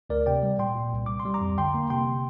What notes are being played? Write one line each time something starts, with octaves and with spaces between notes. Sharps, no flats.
D2 A#4 D5
C3 D5 G5
G3
A#2 G5 C6
A#2
C2
C2 D6
C6
G3
A#5 D6
F2
D3 G5 C6
A#3
C3 G5 C6